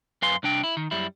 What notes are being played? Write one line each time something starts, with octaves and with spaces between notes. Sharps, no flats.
F#2 B4 F5 G#5 C6
C2 D4 G5
E4
D#3
F#2 G3 E4